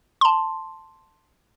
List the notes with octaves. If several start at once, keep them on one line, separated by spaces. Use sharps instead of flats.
A5 C6